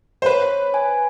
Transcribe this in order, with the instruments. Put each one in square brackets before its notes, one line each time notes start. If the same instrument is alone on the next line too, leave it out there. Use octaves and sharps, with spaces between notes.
[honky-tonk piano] C5
[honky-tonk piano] B4 [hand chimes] C#5
[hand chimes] G#5